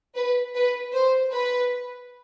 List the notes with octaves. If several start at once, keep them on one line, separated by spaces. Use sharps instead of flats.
B4
B4
C5
B4